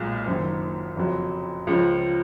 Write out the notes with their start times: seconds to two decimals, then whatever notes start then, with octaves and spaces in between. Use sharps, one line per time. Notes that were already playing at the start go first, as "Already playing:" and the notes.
Already playing: B1 A#2 G#3
0.26 F#1 F#2 D#3
0.96 F1 F2 C#3 F#3
1.67 C#2 C#3 F3